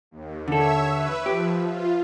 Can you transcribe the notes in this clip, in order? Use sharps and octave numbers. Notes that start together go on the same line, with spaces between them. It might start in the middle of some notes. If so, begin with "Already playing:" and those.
D#2
D3 A4 C#5 E5 E6
B4 E5
F3 G4
F4